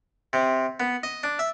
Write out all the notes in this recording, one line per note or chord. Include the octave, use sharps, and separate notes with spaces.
C3
B3
D#5
D4
E5